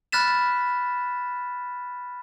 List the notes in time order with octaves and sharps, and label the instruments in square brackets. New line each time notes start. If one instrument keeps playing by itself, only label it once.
[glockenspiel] B5 F6 F#6 A6 B6 E7